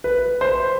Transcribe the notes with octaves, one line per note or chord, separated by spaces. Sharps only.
B4
C5